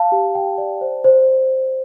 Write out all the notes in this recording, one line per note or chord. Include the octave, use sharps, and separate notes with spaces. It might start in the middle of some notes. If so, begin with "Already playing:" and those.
Already playing: F5 A5
G4
G5
D5
C5
C5